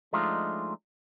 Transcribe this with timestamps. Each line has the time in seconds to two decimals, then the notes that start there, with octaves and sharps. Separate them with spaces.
0.13 F3 G#3 A3 D4 D#4 F4